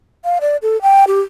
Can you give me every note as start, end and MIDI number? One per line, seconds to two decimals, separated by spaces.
0.24 0.38 77
0.41 0.57 74
0.62 0.80 69
0.82 1.04 79
1.07 1.21 67